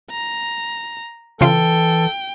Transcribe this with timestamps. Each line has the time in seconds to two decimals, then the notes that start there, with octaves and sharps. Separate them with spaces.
0.11 A#5
1.41 C#3 E3 F4 A4 G5